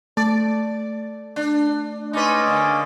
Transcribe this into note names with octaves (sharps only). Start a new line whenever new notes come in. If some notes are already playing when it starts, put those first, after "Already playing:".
A3 D5
D4
G#3 C#4 D#4 B4 D5
D3 A#3